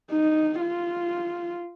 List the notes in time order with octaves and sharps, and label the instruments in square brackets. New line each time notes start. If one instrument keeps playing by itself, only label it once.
[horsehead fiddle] D#4
F4